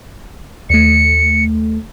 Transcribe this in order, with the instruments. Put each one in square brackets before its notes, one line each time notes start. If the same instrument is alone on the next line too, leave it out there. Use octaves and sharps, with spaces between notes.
[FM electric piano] D#2 A3 [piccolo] C#7